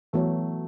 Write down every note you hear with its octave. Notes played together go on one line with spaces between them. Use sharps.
E3 F#3 A3 B3 F#4 C#5